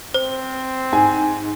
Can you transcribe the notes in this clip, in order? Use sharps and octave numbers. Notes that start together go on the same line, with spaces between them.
C4 C5
G#2 G#5